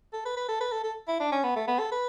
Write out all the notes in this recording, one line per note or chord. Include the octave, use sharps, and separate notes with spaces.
A4
B4
B4
A4
B4
A4
A4
E4
D4
C#4
B3
A3
B3
A4
B4